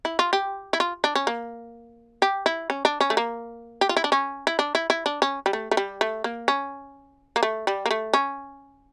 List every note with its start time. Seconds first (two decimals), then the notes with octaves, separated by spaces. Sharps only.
0.05 E4
0.19 F4
0.33 G4
0.73 E4
0.80 F4
1.04 D4
1.15 C#4
1.27 A#3
2.22 G4
2.46 E4
2.70 C#4
2.85 D4
3.01 C#4
3.10 A3
3.17 A#3
3.81 G4
3.89 F4
3.97 E4
4.04 D4
4.12 C#4
4.47 E4
4.59 D4
4.75 E4
4.90 E4
5.06 D4
5.22 C#4
5.46 G3
5.53 A3
5.71 A3
5.77 G3
6.01 A3
6.24 A#3
6.48 C#4
7.36 A#3
7.43 A3
7.67 G3
7.86 A#3
7.91 A3
8.13 C#4